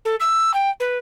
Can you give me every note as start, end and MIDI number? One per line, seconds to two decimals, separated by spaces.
0.05 0.15 69
0.20 0.54 88
0.54 0.69 79
0.80 0.98 71